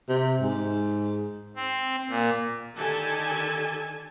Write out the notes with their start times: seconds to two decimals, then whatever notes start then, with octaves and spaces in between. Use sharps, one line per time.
0.09 C3
0.40 G#2
1.56 C4
2.10 A#2
2.75 D3 D#3 G4 A4 G#5 A5